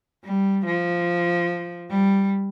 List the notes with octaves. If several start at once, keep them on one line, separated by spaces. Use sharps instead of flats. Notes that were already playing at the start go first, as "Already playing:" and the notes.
G3
F3
G3